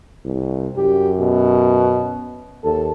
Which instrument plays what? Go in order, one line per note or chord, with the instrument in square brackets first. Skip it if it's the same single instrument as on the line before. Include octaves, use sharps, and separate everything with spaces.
[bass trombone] C2
[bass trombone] F#2 [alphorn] G4
[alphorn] B2
[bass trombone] D#2 [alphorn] A4